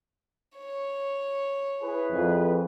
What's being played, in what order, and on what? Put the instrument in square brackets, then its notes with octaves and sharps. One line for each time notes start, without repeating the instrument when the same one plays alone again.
[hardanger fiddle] C#5
[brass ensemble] E4 G#4 B4
[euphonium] F2